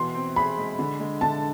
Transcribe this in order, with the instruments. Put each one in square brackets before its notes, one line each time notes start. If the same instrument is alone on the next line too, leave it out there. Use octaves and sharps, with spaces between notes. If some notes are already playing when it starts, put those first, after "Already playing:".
Already playing: [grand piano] B2 E3 [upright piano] C6
[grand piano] C4
[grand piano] G#4 [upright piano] B5
[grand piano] G#3
D3
G#3
[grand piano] D3 [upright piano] A5